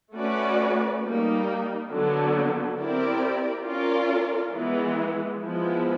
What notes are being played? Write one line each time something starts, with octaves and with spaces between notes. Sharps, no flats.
A3 C#4 F#4 B4 D5
G3 A#3 D#4
D3 F#3 B3
C4 E4 G4 A#4 D5
C#4 F4 A#4 D5
E3 G#3 B3
F3 G#3 B3 E4